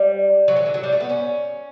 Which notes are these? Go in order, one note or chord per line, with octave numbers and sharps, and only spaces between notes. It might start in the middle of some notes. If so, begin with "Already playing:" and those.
Already playing: G3
F#3
E3
D3
F#3
G3
A3
B3
C#4